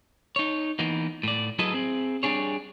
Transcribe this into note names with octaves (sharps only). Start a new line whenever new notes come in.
D#4 C#5
E3 A#3 B3 D#4
A2 D5
F#3 E4 G#4 A4 B4 D#5
C4 G#4
G3 D4 G#4 C#5